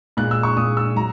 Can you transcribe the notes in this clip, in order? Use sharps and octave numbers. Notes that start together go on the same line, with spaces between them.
A#2 G#3 F#6
E6
C#6
A#2 G#3 D#6
E6
F#3 A#5